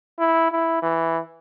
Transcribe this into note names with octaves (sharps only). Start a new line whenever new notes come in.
E4
E4
E3